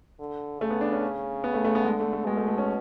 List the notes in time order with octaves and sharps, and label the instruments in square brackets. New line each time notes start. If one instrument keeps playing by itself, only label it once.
[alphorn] D3
[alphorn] C#3 [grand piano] A3
[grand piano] B3
D4
C#4
[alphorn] C#3
[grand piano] B3
A3
A3
B3
[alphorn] D3 [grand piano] G#3
[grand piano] A3
A3
[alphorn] B2 [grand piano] G#3
[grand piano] A3
A3
C#4